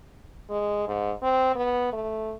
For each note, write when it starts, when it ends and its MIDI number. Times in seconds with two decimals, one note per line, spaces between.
0.50 0.83 56
0.88 1.12 44
1.22 1.53 60
1.55 1.90 59
1.93 2.34 57